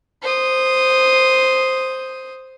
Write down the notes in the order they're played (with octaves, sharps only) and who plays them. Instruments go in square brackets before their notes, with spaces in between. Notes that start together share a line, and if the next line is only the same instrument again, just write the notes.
[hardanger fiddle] C5 D#6